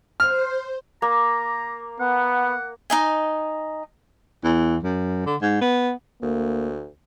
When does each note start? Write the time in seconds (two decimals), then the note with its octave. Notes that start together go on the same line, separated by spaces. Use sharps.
0.20 C5 F6
1.02 A#3 A#5
2.00 B3 F#5
2.90 D#4 D#5 G#5
4.44 E2
4.83 F#2
5.26 D3
5.42 G#2
5.61 B3
6.22 D2 A#3